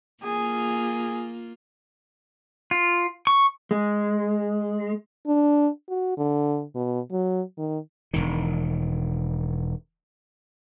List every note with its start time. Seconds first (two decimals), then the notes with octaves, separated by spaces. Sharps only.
0.24 A#3 F4 G#4
2.71 F4
3.27 C#6
3.71 G#3
5.26 D4
5.89 F#4
6.18 D3
6.75 B2
7.12 F#3
7.57 D#3
8.14 E1 A#1 D#3